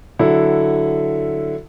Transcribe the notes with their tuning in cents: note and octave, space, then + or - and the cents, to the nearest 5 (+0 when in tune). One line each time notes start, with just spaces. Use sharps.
D3 +0 F#3 +0 E4 +0